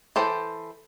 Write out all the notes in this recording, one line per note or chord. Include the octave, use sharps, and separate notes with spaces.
E3 A4 C5 G5